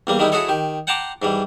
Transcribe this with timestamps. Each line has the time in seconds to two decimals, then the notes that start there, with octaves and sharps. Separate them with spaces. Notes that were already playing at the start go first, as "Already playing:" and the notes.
0.07 E2 G3 A#3
0.19 D#3 G3 G#3 D#4 E4
0.32 E4 F#4 G#4 A4 C#5 D#5
0.49 D#3 G4
0.87 F#5 G5 A5 A#5 C6 D6
1.22 G#2 E3 G3